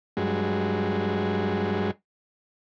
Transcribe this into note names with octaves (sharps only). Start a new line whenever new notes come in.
G2 F#3 G#3